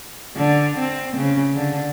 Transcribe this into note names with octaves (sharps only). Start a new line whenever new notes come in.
D3
C4
C#3
D3